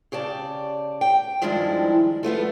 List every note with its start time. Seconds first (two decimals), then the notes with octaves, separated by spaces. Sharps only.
0.12 C#3 G4 D5 A5
1.01 G5
1.42 G2 D#3 F3 G#3 D4 E4
2.23 F3 A3 B3 F4